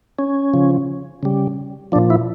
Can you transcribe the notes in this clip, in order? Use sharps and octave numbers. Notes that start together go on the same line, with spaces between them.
C#4
C#3 F3
C#3 G3
A#2 F3 D4
E4